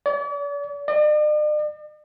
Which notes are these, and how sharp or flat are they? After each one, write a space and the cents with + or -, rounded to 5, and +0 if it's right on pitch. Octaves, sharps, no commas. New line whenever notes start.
D5 -45
D5 +45